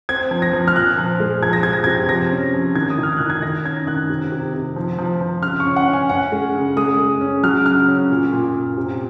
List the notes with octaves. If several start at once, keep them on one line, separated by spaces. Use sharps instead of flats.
C4 G#6
F3
A#6
F3
F6
A#2 F#6
F3
G#3
F3 G#6
A#6
C3 G#6
A#6
C3 G#6
F3 A#6
C#4
F3
D#3 G#6
D#6
D#3 F6
D#3 F#6
G#6
D#3 A#6
C#4 G#6
D#3 F#6
C3
C3
C3
F3
F3
F3
C#3 F6
C#6
C#4
F#5
C#4
G#5
C#4 F#5
G#3
C#3
G#3 D#6
G#3
C#4
F#3 F6
C#3 F6
C#4
A#2
A#2
A#2
C3